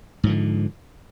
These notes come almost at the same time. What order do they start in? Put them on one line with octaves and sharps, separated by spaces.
G#2 F3 D3